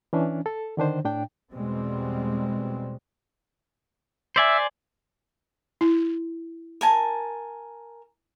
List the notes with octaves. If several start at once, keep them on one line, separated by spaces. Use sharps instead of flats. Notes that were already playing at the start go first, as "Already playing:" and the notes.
E3 C#4 D4
A4
D3 D#3 D4 C5
A2 D4 G5
E2 B2 G3 G#3 C4
C5 D5 E5 G#5
E4
A#4 G#5 A5